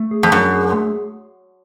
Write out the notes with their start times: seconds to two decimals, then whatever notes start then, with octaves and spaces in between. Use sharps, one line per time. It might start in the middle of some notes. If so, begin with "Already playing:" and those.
Already playing: A3
0.11 G#4
0.23 F2
0.32 F#2 D4
0.53 G#4
0.73 A3